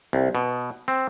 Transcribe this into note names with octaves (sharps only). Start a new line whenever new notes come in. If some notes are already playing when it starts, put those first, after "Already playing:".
C2
B2
C4